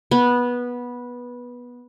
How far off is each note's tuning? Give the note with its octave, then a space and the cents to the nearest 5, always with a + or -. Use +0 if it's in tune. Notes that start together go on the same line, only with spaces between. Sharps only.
B3 -15